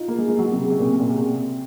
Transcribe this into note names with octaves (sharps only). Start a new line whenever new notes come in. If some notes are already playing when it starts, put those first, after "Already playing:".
Already playing: D#4 F4
A#3
G#3
G#3
F#3
C3
C#3
C3
A#2
C3
A#2
C3
C3